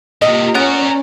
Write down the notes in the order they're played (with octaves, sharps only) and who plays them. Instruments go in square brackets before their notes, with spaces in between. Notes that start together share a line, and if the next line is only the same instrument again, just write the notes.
[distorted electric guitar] A2 C3 [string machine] A#3 F4 G4 [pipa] D#5
[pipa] B3 [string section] C#4 [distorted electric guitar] F#4 A#4 [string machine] D5